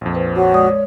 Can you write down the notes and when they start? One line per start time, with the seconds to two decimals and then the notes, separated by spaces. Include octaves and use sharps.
0.01 A#1 F2
0.15 B4 C5
0.36 F#4 C#5
0.52 G#3 D5 D#6